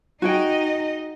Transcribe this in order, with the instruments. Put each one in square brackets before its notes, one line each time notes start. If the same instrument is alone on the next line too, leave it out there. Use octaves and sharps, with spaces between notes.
[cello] D#4 D#5 [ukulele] F#4 G#4 G5